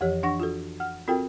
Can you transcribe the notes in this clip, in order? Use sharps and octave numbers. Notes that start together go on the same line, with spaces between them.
F2 E3 F3 G4 C#5
E3 D4 F#5 C#6 A#6
F4 F#4 A4
F#5 F6
C4 F4 F#4 A4 A#4 G5